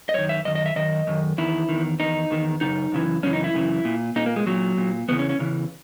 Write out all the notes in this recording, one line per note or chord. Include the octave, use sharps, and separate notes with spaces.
D#5
F#2 D#3 C#5
E5
F#2 D#3 D#5
D#5
E5
F#2 D#3 D#5
F#2 D#3
E2 D#3 E4
E2 D#3
E2 D#3 D#4
E2 D#3
F#2 C#3 D#4
F#2 C#3 E3
F#2 C#3 E3 C#4
D#4
E4
F#2 C#3 E3
A#2
A#2 D#4
A#3
G#3
A#2 F#3
A#2
E2 C#3 E3 B3
C#4
C#4
E2 C#3 E3